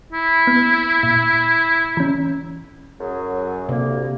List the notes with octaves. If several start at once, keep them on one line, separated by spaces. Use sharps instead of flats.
E4
B3
A#2
E3 C#4
F#2 F#3 G#4
D2 C3 A#3